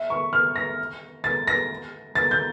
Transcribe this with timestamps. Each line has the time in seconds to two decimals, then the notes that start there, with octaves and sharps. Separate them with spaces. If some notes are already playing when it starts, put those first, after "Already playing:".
Already playing: E5
0.10 C#6
0.33 F6
0.56 A#6
1.24 A6
1.47 A#6
2.15 A6
2.31 G6